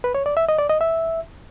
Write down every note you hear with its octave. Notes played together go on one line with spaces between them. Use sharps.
B4
C#5
D5
E5
D#5
D5
D#5
E5